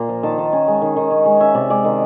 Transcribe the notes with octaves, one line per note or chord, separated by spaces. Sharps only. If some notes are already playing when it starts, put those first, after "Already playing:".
Already playing: A#2 A#3 A#5 C6
F3
D#3 A5
D#3
C#4
G#3
D#3
D#3
C#4
G#3
C#4 E5
C3 D5
G#3 D5
D#3